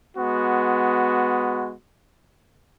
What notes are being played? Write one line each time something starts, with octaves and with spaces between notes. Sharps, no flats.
G#3 B3 F#4